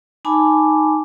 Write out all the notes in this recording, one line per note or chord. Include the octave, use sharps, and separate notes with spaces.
D#4 G#5 A5 B5 D6